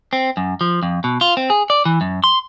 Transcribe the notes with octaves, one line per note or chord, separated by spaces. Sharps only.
C4
F#2
F3
F2
B2
F4
C4
G#4
D5
E3
F#2
C6